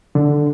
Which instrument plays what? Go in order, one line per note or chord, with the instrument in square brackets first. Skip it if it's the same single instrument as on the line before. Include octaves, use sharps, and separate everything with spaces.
[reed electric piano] D3